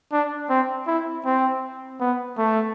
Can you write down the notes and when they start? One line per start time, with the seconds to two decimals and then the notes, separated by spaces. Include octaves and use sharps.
0.12 D4
0.50 C4
0.87 E4
1.25 C4
2.00 B3
2.38 A3